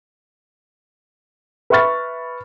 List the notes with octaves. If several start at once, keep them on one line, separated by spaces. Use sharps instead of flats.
B4 E5 B5 C#6 F6 A6